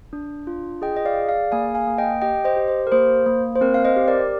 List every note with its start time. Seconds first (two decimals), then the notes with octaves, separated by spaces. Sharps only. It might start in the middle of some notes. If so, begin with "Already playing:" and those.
0.13 D4
0.47 F4
0.82 G#4 D#5 G5
0.97 D#5
1.05 D5 F5
1.18 G#4
1.29 D5 F5
1.52 A#3 F5 G#5
1.75 F5 G#5
1.87 A#3
1.98 D#5 G5
2.22 G4 D#5 G5
2.44 C5 D#5
2.56 G4
2.68 C5
2.87 A#4
2.92 A#3 C5
3.26 A#3
3.55 C5
3.61 C4 A#4
3.74 F5
3.85 C5 D#5
3.96 G4
4.08 A#4 D5